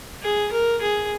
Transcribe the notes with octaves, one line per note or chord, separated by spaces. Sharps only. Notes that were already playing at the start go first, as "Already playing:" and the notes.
G#4
A#4
G#4